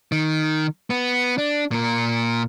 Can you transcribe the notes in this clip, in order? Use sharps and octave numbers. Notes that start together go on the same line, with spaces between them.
D#3
B3
D4
A#2 A#4